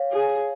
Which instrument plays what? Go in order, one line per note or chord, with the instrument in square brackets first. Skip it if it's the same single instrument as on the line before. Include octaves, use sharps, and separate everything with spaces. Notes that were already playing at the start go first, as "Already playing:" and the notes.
Already playing: [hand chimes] C#5 F5
[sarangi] G#4